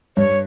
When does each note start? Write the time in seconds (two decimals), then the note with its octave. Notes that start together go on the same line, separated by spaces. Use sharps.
0.17 G2 C#5